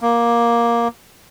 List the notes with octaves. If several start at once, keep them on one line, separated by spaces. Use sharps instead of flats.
A#3